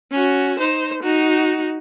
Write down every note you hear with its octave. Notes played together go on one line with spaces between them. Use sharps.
C#4 F#4
D#4 C5
D#4 F#4